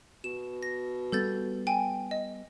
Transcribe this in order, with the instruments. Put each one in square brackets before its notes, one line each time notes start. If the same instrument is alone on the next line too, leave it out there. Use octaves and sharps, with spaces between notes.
[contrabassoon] B2 [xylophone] E7
[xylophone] A#6
[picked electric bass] G3 B3 [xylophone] A4 G6 A6
[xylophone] G5 G#5
D#5